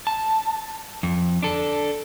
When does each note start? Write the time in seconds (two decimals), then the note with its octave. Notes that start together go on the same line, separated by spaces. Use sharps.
0.07 A5
1.03 F2
1.43 D4 A4